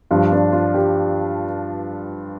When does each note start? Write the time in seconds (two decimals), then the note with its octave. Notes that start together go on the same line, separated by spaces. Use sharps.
0.11 G2 F3 F4
0.32 D4
0.52 F4
0.74 G4